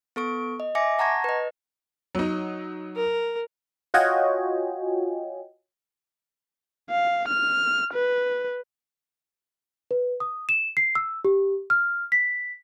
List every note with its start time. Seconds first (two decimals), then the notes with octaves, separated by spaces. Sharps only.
0.16 B3 A4 C#6 D7
0.60 D#5
0.75 E5 G#5 D6 A#6 C#7
0.99 F#5 A5 A#5 C#6 G#6 A#6
1.24 B4 D#5
2.15 F#3 D#4
2.96 A#4
3.94 F4 F#4 C#5 D#5 G5 G#5
6.90 F5
7.28 F6
7.94 B4
9.91 B4
10.20 D#6
10.49 E7
10.77 C7
10.95 E6
11.25 G4
11.70 F6
12.12 B6